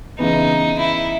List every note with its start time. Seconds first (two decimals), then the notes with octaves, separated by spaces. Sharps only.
0.19 C#3 E3 B3 D#4
0.78 E4